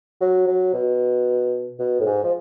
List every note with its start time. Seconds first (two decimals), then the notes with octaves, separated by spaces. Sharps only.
0.21 F#3
0.47 F#3
0.73 B2
1.79 B2
2.00 A2
2.06 G#2
2.23 F3